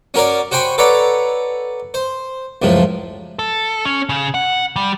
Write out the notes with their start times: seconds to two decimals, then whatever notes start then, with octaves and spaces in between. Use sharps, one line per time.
0.14 C#4 F#4 A#4 C#5 D5
0.51 F#4 C5 G5 G#5 B5 C#6
0.78 A4 B4 C#5 D5 F#5 A#5
1.94 C5
2.62 C#2 F#2 A2 F3
3.39 A4
3.85 C#4
4.09 C#3
4.34 F#5
4.76 G3